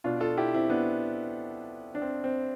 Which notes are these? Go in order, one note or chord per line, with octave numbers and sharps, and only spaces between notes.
B2 D4 F4
F4 A4
E4 G4
C4 E4
B3 D4
D4
C4
C4